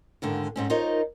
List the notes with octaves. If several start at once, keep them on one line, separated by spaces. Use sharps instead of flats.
D#2 G#2 D3
G#2 C4 C#4
D#4 F4 A#4 C5 C#5 D#5